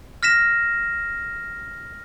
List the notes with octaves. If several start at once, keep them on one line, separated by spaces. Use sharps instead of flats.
F6 A#6 B6 E7